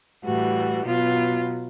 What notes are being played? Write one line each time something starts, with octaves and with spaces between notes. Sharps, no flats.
A2 E3 G3 F#4
B2 F#3 B3 F4